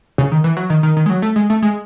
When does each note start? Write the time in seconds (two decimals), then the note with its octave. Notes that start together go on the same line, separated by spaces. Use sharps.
0.18 C#3
0.32 D#3
0.44 E3
0.57 F#3
0.70 D#3
0.83 D#3
0.97 D#3
1.06 G#3
1.10 F#3
1.22 A3
1.36 G#3
1.50 A3
1.62 G#3